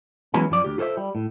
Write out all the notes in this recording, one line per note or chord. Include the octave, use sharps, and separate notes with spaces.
E3 F#3 G#3 B3 C#4 E4
F#2 F3 D5
D2 G4
F4 A4 C5 C#5 E5
G3
A2